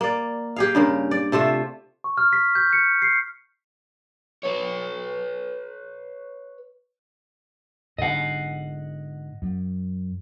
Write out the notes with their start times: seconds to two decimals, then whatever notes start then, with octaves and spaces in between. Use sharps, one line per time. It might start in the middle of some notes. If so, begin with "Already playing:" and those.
0.01 A#3 D5
0.56 G4 G#4 F5
0.75 G2 C#3 A#4
1.11 D5
1.32 C3 A3 F4 E5
2.04 C#6
2.18 F6
2.33 B6
2.55 G6
2.73 C#7
3.02 C7
4.43 B4 C#5
7.99 G#2 D3 D#5 F#5
9.42 F#2